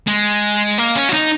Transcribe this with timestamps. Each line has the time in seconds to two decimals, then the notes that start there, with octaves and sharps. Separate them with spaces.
0.07 G#3
0.78 A#3
0.95 C#4
1.09 F#4
1.13 D#4